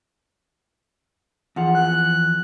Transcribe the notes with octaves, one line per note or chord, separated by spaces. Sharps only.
E2 F3 F#5
F#6